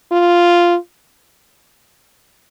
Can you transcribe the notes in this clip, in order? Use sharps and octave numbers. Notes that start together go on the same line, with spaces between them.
F4